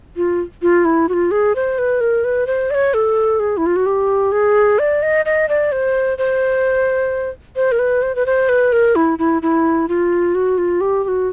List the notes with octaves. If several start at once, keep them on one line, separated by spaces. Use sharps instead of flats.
F4
F4
E4
F#4
F4
G#4
C5
B4
A#4
B4
C5
D5
C#5
A4
G#4
E4
F4
F#4
G4
G#4
D5
D#5
D#5
D5
C5
C5
C5
A#4
B4
C5
B4
C5
B4
A#4
E4
E4
E4
F4
F#4
F4
G4
G4
F#4